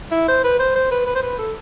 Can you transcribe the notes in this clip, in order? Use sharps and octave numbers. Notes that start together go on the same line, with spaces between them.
E4
C5
B4
C5
C5
B4
B4
C5
B4
A4